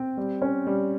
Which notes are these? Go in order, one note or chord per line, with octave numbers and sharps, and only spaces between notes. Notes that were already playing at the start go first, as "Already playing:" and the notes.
Already playing: C4 G5
G3
C#4
G3